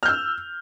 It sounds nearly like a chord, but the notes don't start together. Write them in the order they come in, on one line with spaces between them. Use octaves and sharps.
F6 G6 E6